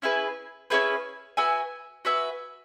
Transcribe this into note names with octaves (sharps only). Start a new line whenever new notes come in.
C#4 E4 G#4 B4
C#4 E4 G#4 B4
F#4 B4 E5 G#5
F#4 B4 E5 G#5